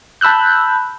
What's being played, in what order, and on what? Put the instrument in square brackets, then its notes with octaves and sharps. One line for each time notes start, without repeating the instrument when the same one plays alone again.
[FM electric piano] A5 B5 E6 F#6 G6